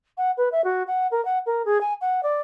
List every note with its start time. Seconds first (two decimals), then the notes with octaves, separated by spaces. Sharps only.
0.18 F#5
0.37 B4
0.52 E5
0.64 F#4
0.87 F#5
1.11 A#4
1.25 F#5
1.46 A#4
1.65 G#4
1.81 G#5
2.01 F#5
2.23 D5